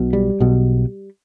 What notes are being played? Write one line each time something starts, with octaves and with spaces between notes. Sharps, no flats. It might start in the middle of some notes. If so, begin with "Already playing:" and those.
Already playing: B1 B2
G3
B1 B2